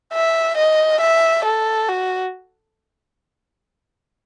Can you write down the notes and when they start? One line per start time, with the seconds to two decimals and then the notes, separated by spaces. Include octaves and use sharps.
0.13 E5
0.57 D#5
1.01 E5
1.45 A4
1.89 F#4